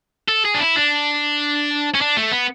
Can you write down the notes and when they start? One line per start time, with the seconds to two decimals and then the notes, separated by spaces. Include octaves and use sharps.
0.28 A4
0.45 G#4
0.54 D4
0.61 E4
0.76 D4
1.94 C#4
2.01 D4
2.17 A3
2.32 B3